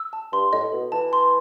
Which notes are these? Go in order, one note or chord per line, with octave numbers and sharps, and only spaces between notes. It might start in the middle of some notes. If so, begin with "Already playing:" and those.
Already playing: E6
A5
G2 C6
A2 D#5
B2 A4
E3 A5
C6